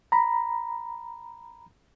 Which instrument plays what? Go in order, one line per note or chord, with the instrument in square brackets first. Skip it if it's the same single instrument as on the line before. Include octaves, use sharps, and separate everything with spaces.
[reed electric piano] A#5 B5